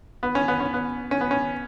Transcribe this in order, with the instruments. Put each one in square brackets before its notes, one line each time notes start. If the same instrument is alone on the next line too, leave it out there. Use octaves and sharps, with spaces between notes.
[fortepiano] B3
C#4
B3
C#4
B3
C#4
B3
C#4